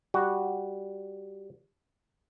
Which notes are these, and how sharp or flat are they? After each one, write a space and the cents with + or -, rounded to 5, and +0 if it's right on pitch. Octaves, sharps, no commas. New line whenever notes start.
G3 +0 F#4 +0